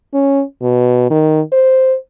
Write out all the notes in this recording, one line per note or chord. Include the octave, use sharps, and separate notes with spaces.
C#4
B2
D#3
C5